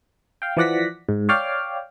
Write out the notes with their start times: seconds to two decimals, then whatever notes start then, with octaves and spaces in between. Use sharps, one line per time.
0.42 F5 G5
0.57 E3 F3 D5 F#5 A#6 B6
1.09 G#2
1.29 C#5 D5 F5 G5 D6 F6